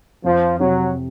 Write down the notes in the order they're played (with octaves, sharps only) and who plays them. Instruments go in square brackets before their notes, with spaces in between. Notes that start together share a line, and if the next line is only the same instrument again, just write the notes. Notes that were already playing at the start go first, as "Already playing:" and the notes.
[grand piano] F2 [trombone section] F3
[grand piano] C3 [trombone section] F#3